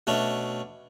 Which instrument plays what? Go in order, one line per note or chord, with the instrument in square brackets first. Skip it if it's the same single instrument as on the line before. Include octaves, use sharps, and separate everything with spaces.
[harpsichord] B2 A3 C#4 D4